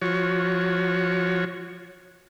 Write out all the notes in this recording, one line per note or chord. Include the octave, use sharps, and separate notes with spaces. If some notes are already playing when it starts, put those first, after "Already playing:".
F3 F#4 C#5